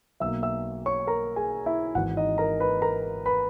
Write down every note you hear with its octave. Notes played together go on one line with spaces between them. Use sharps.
B1 B2 A#3 E5 E6
E5 E6
C#5 C#6
A#4 A#5
G#4 G#5
E4 E5
G#1 G#2 E3 F#4 F#5
D#4 D#5
A#4 A#5
B4 B5
A#4 A#5
B4 B5